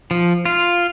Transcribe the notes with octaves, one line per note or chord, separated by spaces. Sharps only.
F3
F4